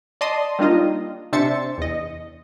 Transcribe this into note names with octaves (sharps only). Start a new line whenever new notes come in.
D5 D#5 A5 C6 D#6
G3 A#3 D4 D#4 F4 D#5
C3 D4 C5 E5 A6 C#7
E2 D#5